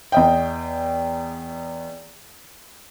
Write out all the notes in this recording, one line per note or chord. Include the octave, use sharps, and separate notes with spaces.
E2 D#5 G5